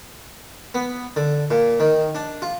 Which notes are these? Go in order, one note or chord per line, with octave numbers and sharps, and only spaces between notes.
B3
D3
A#2
D#3
D4
F4